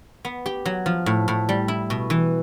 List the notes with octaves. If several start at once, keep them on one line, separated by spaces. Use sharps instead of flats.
B3
G4
F#3
F3
A2
A2
G3
E4
B2
E3